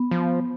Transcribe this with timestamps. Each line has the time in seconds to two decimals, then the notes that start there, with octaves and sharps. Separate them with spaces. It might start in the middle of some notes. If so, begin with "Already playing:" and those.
Already playing: B3
0.11 F3